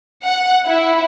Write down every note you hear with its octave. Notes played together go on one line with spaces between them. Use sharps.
F#5
E4